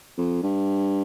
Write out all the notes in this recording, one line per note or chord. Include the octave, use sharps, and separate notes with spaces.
F2
G2